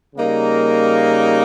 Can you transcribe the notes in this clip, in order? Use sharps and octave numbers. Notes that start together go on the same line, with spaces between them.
C#3 G3 A#3 D#4